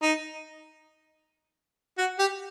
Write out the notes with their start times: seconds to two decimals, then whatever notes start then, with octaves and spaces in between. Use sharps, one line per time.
0.02 D#4
1.98 F#4
2.19 G4